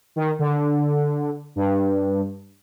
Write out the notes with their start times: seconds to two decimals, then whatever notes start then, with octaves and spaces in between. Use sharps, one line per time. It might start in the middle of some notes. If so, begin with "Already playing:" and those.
0.16 D#3
0.39 D3
1.56 G2